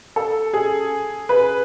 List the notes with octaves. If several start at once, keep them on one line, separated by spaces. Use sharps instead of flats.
A4
G#4
B4